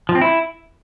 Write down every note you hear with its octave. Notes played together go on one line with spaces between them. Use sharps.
F3
C4
E4